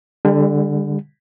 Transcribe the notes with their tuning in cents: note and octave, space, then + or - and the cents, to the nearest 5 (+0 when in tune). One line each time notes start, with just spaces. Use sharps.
D3 +0 G3 +35